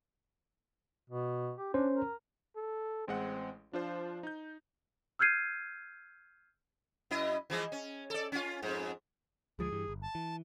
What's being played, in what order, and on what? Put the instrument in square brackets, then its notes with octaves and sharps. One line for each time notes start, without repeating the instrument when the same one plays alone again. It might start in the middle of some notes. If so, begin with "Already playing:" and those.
[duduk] B2
G4
[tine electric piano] C#4 C5 [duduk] D4
[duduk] A#4
[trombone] A4
[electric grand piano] A1 G#3 F#5 [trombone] C4
[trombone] F3 [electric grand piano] D4 F4 C5
[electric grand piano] D#4 G6
[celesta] E6 F6 G6 G#6 C7 D#7
[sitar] F#2 E4 D#5
E3 F3 G#3
C#4
A4 D5
C#4 F4
F2 G#2
[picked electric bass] D2 F3 G#3 [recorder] G#4
[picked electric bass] G2 E3 G3
G1
[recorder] A5
[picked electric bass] E3